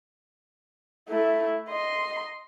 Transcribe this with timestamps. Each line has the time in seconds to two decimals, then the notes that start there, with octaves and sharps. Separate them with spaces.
1.09 A3 E4
1.69 D#5 C6